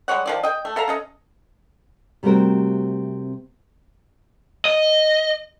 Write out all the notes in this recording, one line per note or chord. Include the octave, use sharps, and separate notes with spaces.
G3 G#3 C#5 F#5
D#3 F3 D5
D#5 G5
A3
A4 E5 F5 A#5
C#4 A4 D#5
C3 G3 A3 C4 F#4 A#4
D#5